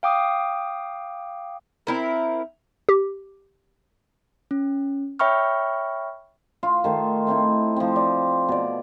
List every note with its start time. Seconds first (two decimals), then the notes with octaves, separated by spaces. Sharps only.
0.03 F5 G5 D6 D#6
1.87 C4 E4 A#4
2.89 G4
4.51 C#4
5.19 C#5 E5 G5 B5 C#6 F6
6.63 F4
6.84 D#3 A3 C5
7.27 A3 C4 D#4 E4
7.76 F3 C4
7.96 D5
8.49 B2 D5